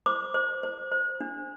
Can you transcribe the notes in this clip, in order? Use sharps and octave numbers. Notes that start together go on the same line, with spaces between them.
C5 D6
C5
C5
C5
D4